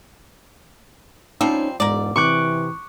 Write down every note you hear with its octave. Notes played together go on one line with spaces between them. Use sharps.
F3 G3 C4 C#4 D#4
E1 G#2 A#4 D5
C3 E3 C#6 D6 F#6